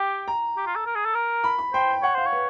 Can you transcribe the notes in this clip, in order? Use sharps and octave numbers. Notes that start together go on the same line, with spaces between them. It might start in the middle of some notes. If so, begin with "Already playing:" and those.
Already playing: G4 G5
A#5
G4
F4
A4
A#4
G#4
A4
A#4
B5
B5
C5 G5
C#5 F#5
C5 F5
C#5
B4